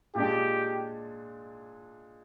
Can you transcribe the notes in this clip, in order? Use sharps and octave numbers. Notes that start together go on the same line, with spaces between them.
A#2 G#3 D4 G4